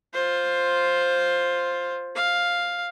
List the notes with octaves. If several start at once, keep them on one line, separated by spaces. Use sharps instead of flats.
F4 C5
F5